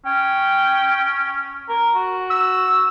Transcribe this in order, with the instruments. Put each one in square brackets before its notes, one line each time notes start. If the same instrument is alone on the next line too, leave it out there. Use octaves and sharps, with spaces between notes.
[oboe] C#4 [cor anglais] G5
[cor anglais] A#4
F#4
[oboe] E6